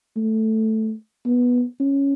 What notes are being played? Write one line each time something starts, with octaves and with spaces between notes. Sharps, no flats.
A3
B3
C#4